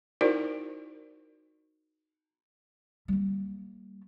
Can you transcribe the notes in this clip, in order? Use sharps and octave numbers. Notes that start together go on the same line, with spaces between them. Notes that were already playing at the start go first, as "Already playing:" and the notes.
D#4 E4 F#4 A#4 C5 D5
G3 A#3